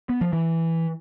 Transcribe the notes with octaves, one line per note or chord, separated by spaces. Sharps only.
B3
F3
E3